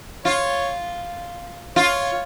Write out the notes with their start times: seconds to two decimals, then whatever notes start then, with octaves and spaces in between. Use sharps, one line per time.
0.25 F4 C#5
1.76 F4 C#5